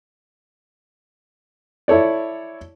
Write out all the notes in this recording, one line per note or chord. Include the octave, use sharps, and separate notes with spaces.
E4 A4 C#5 D5